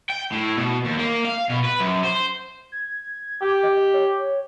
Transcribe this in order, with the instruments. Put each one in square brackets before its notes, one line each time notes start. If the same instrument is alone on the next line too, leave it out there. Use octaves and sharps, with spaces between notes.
[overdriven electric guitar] G5
A2
B2
D#2
A#3
F5
B2
B4
F#2
C5
[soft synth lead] G#6
[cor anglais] G4
[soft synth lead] D#5
C#5